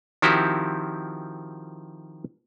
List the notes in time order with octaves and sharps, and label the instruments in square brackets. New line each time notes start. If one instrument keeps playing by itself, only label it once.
[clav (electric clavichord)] D#3 F3 C4 E4 F#4 G4